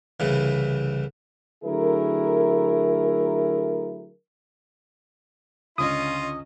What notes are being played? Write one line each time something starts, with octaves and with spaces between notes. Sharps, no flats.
C2 C#3 E3
D3 F#3 A3 E4 G#4 A#4
C#2 D3 C#4 F4 D#5 D#6